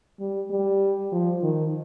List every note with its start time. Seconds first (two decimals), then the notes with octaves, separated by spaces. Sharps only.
0.20 G3
0.50 G3
1.12 F3
1.43 D#3